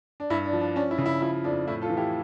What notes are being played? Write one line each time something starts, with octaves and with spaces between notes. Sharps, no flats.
D4
G2 E4
D4
F3
D4
C#4 D4
E4
C#3
E4
F3 E4
F2 D4
A2 E4
F4 A4
E3
E4 G4